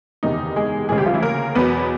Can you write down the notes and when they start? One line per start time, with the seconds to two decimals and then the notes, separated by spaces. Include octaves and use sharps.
0.23 F#1 E2 C3 D#3 D#4
0.56 G#3 G#4
0.89 D2 C#3 E3 G#3 G#4
0.98 G3 G4
1.06 F3 F4
1.14 E3 E4
1.22 A#3 A#4
1.55 E2 B2 F#3 B3 B4